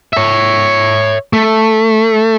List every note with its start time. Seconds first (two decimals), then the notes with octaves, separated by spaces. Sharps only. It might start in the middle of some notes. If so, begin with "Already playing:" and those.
0.13 C#5 E5
1.33 A3